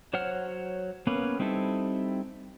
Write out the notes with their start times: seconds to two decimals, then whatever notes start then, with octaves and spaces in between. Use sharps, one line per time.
0.13 F#3 C5 C#5 F#5 F6
1.07 A#3 B3 C#4 B4
1.39 G3 C4 D#4 E4 A4